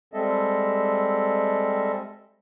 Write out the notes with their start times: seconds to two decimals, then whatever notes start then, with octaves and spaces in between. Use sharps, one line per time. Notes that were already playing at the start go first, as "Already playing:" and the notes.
0.14 G3 G#3 C4 A4 D#5 E5